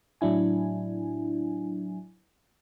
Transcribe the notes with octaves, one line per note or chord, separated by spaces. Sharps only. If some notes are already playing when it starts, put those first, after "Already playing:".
A2 F#3 D4 E4 G#5